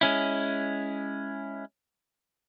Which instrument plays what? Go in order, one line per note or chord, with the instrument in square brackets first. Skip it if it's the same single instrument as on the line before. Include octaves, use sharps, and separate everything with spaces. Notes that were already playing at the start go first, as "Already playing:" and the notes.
[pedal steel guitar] G#3 C#4 E4